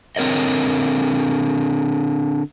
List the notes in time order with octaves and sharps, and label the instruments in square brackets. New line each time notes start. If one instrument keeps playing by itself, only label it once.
[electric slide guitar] D3 C4 A#4 C#5 D#5